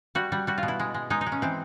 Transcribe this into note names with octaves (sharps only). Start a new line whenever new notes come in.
G3 F#4
G3
G3 F#4
F4
B2
E4
G#3
G#3
G#3 D#4
D#4
G#3
C#4
E3 C4